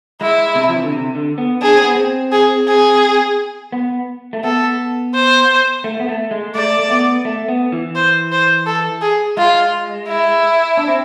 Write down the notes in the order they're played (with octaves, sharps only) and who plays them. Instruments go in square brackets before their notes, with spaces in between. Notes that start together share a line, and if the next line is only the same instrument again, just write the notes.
[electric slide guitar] G#3 [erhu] E4
[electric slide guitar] C3
F3
E3
D3
C3
D3
B3
[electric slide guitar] D4 [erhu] G#4
[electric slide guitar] C4
B3
C4
[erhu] G#4
G#4
[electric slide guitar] B3
A3
[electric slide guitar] B3 [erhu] A4
[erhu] C5
[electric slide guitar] A3
B3
A3
G#3
[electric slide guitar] A3 [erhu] D5
[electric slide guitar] A3
B3
A3
B3
E3
[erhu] C5
C5
A4
G#4
[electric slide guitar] G#3 [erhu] F4
[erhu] E4
[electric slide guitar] D4
C4